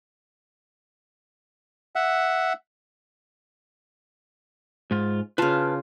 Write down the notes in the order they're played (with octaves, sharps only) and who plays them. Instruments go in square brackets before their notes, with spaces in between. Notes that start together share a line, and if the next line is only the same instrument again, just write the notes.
[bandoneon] E5 F#5
[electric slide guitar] G#2 F4
[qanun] C#3 F4 [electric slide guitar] B4 A5